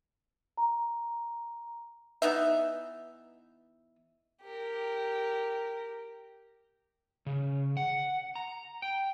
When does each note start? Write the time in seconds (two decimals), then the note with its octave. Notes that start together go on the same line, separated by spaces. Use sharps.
0.58 A#5
2.22 E3 B3 D#4 E5
4.42 G4 A#4
7.26 C#3
7.77 F#5
8.36 A#5
8.82 G5